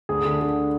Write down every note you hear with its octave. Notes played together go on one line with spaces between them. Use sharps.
D2 G#4
D3
D3